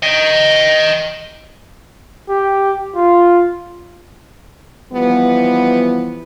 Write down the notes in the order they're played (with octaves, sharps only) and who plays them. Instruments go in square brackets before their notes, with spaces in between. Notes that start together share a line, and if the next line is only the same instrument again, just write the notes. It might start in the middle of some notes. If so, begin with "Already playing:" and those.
[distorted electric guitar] D#5 G5
[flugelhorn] G4
F4
[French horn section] E3 F3 G3 B3